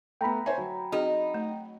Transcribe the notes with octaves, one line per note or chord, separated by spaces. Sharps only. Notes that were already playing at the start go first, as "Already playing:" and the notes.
A3 B3 G5 A#5 B5
C5 C#5 E5 G#5
F#3
C4 D#4 F#4 G#4
A3